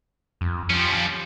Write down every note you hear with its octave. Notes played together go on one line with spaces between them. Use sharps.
F2
F3 G3 C#4